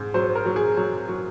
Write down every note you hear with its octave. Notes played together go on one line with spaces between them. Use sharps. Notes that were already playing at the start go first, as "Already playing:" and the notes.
Already playing: G#2
F#3 C5
A#4
F#3
G#4
F#3
F#3